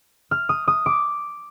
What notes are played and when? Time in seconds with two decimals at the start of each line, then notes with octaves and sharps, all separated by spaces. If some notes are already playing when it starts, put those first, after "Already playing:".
0.31 F6
0.49 D#6
0.68 D#6
0.86 D6